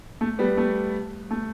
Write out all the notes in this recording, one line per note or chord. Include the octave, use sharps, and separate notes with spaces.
A3
G3 B3
A3
A3